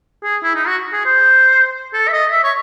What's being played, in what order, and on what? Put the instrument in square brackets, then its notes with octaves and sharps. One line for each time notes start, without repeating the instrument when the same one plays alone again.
[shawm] G#4
E4
D#4
F#4
G#4
C5
A4
E5
D#5
E5
C#5